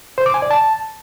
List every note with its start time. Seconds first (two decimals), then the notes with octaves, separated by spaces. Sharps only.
0.18 C5
0.26 D6
0.34 G#5
0.42 D5
0.51 A5